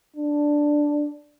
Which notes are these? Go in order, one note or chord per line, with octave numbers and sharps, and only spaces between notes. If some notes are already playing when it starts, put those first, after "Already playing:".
D4